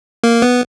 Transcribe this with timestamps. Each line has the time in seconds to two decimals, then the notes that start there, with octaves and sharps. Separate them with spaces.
0.24 A#3
0.42 B3